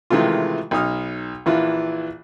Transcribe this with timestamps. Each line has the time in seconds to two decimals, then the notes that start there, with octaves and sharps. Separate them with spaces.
0.10 C3 D#3 E3 G#3 A3 F4
0.71 B1 D#4 D#6 F6
1.46 A#1 E3 E4 F4